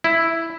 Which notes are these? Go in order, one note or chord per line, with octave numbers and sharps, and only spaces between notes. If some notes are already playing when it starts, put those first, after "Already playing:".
E4